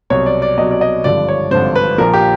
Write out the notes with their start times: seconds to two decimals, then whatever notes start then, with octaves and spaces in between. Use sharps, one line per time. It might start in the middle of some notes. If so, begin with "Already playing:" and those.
0.10 C2 B2 F#3 C#5
0.26 D5
0.42 D5
0.58 C2 B2 F#3 D#5
0.71 D5
0.81 D#5
1.04 G#1 G2 D3 F3 D5
1.29 C#5
1.51 G#1 G2 D3 F3 C5
1.76 B4
1.98 A#1 A#2 F3 A#4
2.14 G4